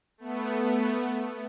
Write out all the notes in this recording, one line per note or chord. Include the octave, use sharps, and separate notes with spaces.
A3 B3